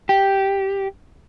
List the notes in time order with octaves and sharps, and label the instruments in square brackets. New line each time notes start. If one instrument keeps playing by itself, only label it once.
[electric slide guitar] G4